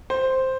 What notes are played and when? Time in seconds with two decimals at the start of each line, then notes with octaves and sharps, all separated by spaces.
0.10 C5